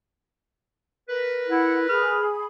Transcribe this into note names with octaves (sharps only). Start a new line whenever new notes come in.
A#4 B4
E4 F#5
G#4 B5 F6